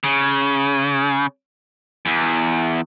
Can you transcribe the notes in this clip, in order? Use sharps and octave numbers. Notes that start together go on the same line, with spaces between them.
C#3
E2